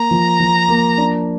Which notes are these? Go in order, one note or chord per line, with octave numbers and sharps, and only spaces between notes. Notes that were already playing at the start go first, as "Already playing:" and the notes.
Already playing: A#3 A#5
F3
F3
A#3
D4